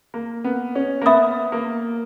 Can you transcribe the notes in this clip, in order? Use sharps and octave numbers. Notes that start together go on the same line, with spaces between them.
A#3
B3
C#4
A#3
B3 E5 B5 D#6
A#3